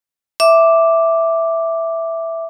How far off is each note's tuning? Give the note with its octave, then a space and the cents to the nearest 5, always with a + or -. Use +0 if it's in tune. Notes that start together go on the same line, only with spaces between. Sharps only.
E5 +0 D6 +0